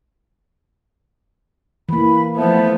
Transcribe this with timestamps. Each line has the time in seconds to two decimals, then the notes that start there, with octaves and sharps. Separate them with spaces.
1.89 E3 A#3 B5
2.36 F3 A3 B3 C5 E5 A5